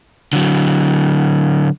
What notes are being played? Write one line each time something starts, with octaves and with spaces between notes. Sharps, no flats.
D3 F#3